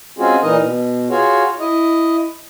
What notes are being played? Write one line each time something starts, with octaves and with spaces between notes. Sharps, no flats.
G#3 C4 C#4 F4 F#4 G#4
A#2 E3 D#4 A#4 D#5
B2
F4 F#4 G#4 C#5
E4 D#5